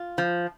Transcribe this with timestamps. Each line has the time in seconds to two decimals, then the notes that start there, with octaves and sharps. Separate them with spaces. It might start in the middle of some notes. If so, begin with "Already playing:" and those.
Already playing: F4
0.18 F3